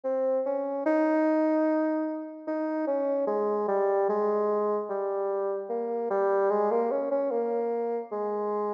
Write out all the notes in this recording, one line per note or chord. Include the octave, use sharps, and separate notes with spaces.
C4
C#4
D#4
D#4
C#4
G#3
G3
G#3
G3
A#3
G3
G#3
A#3
C#4
C#4
A#3
G#3